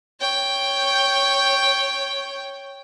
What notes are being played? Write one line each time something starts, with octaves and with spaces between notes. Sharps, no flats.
C#5 G5